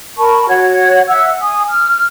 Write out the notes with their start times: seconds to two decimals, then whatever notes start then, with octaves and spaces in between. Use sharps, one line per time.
0.18 A#4 A5 B5 C#6
0.48 F#4 C#5 F#5 G#6
1.08 E5 F#5 E6
1.41 G#5 D#6
1.68 F6